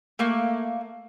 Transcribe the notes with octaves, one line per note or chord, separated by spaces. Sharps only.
A3 A#3